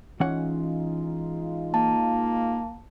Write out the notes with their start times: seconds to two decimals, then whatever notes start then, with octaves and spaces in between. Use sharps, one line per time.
0.20 E3 G#3 C#4 D#4 F4 F#5
1.74 A#3 A5